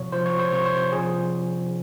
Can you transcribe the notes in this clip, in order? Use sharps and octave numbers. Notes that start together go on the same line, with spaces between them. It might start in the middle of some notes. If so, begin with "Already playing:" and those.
Already playing: C3 F3 C#5
F3 C5
C#5
C5
C3 C#5
C5
F3 G#4